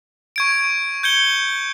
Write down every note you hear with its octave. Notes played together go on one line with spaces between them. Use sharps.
C#6 G#6 D7
G6 G#6 C#7 G7